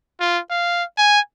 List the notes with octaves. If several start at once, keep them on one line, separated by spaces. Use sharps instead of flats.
F4
F5
G#5